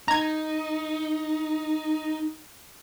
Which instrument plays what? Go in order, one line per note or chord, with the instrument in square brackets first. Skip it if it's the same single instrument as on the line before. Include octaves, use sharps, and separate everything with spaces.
[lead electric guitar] D#4 [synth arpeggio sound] A#5 G#6